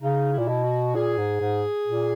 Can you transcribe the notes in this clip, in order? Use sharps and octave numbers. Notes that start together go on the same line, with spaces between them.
C#3 D#4
E4
A#2
B2
F#4
A#2 G#4
G#2
G#2
A#2